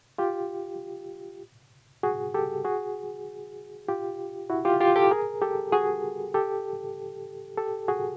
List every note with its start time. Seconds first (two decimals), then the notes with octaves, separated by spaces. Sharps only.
0.18 F4 G4
2.03 F#4 G#4
2.34 G4 A4
2.65 F#4 G#4
3.88 F4 G4
4.50 E4 F#4
4.65 F4 G4
4.80 F4 G4
4.96 G4 A4
5.11 G#4 A#4
5.42 G4 A4
5.72 F#4 G#4
6.34 G4 A4
7.57 G4 A4
7.88 F#4 G#4